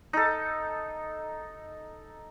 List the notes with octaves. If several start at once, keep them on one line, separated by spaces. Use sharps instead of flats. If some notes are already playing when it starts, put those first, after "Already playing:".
D#4 A4